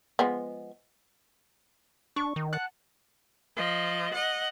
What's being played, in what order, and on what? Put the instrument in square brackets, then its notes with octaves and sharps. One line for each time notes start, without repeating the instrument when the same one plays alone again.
[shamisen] F3 G#3 B3
[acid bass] D4 [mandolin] C#6
[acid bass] D#3
[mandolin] F#5 A5 F#6
[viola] F3 D#5
D#5 F#5